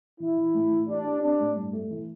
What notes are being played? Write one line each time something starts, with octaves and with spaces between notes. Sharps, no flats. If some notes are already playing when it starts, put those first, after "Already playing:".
E3 E4
E3
A2
E3
D4 G4
G4
C4 D4
A2
G2
A3
E3